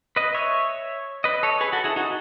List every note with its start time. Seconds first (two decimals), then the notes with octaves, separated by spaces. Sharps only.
0.16 B4 D#5
0.34 C#5 E5
1.24 B4 D#5
1.43 A4 C#5
1.61 G#4 B4
1.73 F#4 A4
1.84 E4 G#4
1.96 D#4 F#4